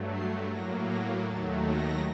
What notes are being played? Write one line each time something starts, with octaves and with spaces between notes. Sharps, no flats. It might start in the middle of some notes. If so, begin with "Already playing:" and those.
Already playing: G2 F#3 A3
C7
A2 F#3 A#3 A#6
A#6
D#2 D#3 F#3 A3 A6
A#6